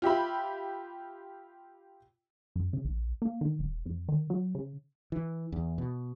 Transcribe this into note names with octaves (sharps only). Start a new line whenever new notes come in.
F4 G4 E5 B5
F#2
C#3
A#1
A#3
D#3
D#1
F2
D#3
F#3
C#3
E3
E2
B2